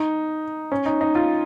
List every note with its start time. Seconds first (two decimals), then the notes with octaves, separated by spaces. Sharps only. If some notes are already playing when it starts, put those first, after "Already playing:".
Already playing: D#4
0.72 C#4
0.86 D#4
1.01 D#4
1.15 F4